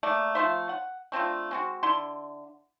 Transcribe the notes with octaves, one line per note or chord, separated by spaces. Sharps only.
A3 A#3 D5
F3 A3 C5 E5
F#5
A3 C4 D4 F4
G#3 C4 F#4
D3 E4 C6